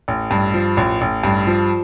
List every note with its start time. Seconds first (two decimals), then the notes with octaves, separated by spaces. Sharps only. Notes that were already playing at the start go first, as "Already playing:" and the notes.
0.08 A1
0.31 G2
0.54 F3
0.77 A1
1.01 A1
1.24 G2
1.47 F3